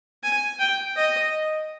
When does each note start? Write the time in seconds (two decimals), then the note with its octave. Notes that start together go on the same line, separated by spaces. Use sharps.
0.23 G#5
0.60 G5
0.96 D#5